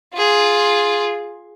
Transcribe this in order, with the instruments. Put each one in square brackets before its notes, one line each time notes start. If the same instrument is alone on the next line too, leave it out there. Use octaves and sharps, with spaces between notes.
[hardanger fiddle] F4 G#4